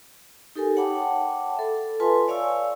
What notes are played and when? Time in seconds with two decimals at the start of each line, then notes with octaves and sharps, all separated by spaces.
0.55 D#4 G4 A4 A#4 G#5
0.76 C#5 F#5 G5 A5 B5 D6
1.57 A4 E5
2.00 F4 A4 B4 G#5 A5 C6
2.28 C#5 D5 F5 G#5 C#6 E6